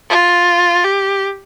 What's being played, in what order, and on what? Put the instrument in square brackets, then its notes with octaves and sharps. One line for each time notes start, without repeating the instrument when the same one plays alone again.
[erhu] F4
G4